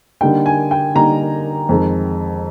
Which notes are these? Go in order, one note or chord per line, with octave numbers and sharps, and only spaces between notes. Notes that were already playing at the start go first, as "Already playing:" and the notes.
D3 G3 A#3 D#4 G5
G#5
G5
D3 G3 A#3 D#4 A#5
F2 D#3 G#3